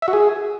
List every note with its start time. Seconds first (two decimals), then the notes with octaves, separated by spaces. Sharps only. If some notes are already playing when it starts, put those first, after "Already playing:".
0.02 E5
0.08 F#4
0.13 G#4